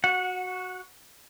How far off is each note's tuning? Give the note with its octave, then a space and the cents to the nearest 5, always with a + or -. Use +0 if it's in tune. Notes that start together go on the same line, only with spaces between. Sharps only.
F#4 +0 F#5 -20